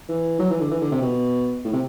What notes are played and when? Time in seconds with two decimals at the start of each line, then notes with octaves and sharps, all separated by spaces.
0.09 E3
0.39 F#3
0.50 E3
0.61 D3
0.71 E3
0.81 D3
0.92 C3
1.02 B2
1.65 A2
1.73 C3